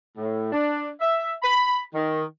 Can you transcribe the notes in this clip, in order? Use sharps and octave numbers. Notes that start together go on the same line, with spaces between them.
A2
D4
E5
B5
D#3